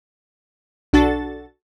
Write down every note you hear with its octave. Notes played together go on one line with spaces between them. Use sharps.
B1 D4 F#4 A4 A6